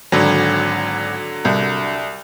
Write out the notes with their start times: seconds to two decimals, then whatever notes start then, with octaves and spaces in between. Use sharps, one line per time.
0.12 G#1 D3 F#3
1.45 C2